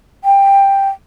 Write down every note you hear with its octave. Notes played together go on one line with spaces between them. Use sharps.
G5